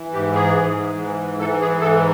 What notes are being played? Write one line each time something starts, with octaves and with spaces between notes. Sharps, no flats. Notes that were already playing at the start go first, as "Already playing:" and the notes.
Already playing: E3
G#2 G4
G#4
G#2
E3
E3 A4
G#4
G#2 A4